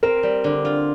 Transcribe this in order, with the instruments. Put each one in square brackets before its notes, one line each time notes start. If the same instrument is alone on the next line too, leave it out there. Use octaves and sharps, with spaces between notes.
[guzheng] C4 [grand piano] A#4
[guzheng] G3
D3
F4